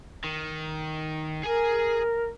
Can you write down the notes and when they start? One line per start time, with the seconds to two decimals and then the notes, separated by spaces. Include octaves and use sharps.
0.24 D#3
1.44 G#4 A#4 G#5